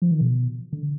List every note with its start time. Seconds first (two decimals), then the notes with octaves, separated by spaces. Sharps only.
0.02 F3
0.11 D#3
0.21 B2
0.73 D3